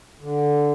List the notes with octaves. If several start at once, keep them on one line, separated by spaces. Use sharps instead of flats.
D3